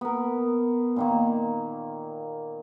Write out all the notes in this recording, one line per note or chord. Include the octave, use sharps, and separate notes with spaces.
B3 A#4
A#2 D#3 A#3